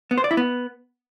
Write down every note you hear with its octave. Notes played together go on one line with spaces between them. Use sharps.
B3
C5
D5
E4
B3